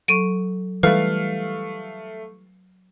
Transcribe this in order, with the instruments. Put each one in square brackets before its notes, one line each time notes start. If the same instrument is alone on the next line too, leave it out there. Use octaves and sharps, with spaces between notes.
[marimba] F#3 A4 C#6 [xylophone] D7 D#7
[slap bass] E3 G3 [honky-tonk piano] A3 F5 [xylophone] B4